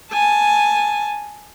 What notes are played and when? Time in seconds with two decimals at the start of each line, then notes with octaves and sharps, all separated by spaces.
0.11 G#5 A5